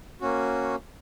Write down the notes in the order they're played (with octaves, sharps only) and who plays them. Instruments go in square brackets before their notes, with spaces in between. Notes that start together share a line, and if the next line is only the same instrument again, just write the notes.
[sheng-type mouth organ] A#3 C#4 F#4